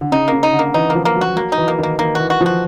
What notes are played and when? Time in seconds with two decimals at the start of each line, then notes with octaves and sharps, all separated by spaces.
0.01 D3
0.12 C#3 D#4
0.28 C#3 A#3
0.43 D#4
0.53 D3
0.59 A#3
0.74 E3 D#4
0.90 A#3
0.95 F3
1.05 A#3
1.16 F#3
1.21 F#4
1.36 F#3 A#3
1.52 D#4
1.58 E3
1.68 A#3
1.79 D#3 A#3
1.99 D#3 A#3
2.15 E3 F#4
2.30 F#4
2.41 F3
2.46 F#4